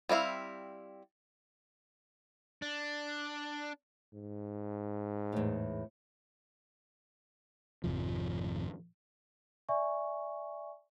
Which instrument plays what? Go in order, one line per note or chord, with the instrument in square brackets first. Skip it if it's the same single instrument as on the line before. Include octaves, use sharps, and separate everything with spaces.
[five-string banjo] G3 C4 E4 F5
[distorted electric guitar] D4
[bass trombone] G#2
[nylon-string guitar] E2 A2
[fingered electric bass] G#1 F2 C3 F3
[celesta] D5 E5 G#5 C#6